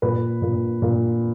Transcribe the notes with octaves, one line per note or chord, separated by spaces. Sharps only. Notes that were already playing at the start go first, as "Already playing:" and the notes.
A#2 B4
A#2
A#2